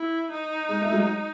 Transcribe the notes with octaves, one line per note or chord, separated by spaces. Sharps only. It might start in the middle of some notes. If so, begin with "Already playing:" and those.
Already playing: E4
D#4
G#3
A3
F#3 G#3